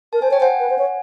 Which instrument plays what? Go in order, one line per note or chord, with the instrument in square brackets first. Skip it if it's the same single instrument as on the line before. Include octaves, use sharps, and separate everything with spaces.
[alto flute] A#4 [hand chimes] A5
[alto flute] C5 [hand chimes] G#5
[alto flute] C#5 [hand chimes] G5
[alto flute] C5 [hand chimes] F#5 G#5
[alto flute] B4
C5
C#5